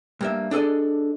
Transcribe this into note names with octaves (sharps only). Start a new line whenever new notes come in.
G2 A#3 E5
D4 G#4 A4 D5 D#5